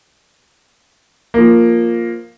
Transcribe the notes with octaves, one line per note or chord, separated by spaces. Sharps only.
F3 A#3